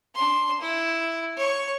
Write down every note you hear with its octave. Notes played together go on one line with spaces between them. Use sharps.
D4 C6
E4
C#5 C#6